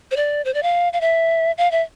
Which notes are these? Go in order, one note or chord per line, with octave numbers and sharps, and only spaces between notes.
C5
D5
C5
D5
F5
F5
E5
F5
E5